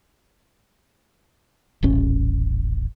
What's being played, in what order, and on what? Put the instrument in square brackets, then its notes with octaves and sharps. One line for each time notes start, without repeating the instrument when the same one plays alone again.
[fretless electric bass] D#1 A1 C#4